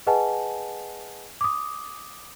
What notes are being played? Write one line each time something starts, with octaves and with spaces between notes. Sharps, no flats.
G#4 B4 D#5 F#5 G#5 A5
D6 D#6